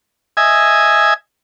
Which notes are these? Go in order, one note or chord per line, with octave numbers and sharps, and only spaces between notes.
D#5 E5 G#5